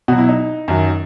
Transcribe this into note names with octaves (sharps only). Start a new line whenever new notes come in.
B2 F#3 F#4
E4
D#4
F#2 D#3 F#3